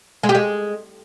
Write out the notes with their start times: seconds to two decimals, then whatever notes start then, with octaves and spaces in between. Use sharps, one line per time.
0.23 G#3
0.29 G4
0.35 G#3